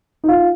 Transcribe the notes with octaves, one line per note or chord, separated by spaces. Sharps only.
D#4
F4